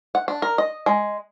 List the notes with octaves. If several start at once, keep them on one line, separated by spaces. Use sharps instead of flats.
F#5
D4
A#4
D#5
G#3